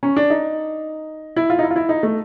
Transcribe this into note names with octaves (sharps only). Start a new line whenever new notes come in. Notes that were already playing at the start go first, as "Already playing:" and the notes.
C#4
D4
D#4
E4
F4
D#4
E4
F4
E4
D#4
A3